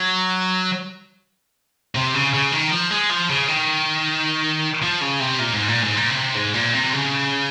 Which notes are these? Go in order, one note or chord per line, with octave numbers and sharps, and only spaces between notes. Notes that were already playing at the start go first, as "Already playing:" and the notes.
Already playing: F#3
C3
C#3
C#3
D#3
F3
G#3
F3
C#3
D#3
F3
C#3
C3
A#2
G#2
A#2
G#2
A#2
C#3
C3
G#2
A#2
C3
C#3